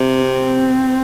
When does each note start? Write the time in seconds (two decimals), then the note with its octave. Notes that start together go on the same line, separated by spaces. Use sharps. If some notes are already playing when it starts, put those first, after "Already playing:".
Already playing: C3
0.22 C4